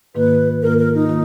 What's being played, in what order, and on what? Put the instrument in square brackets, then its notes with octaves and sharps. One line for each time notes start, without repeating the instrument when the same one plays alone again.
[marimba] G#2 D#3 A#3 F4 [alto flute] B4
[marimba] G#2 D#3 A#3 F4 [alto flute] A#4
[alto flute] A#4
D#4
[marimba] D#3 A#3 F4